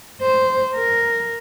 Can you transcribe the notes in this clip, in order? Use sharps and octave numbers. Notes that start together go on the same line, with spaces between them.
C5
A#4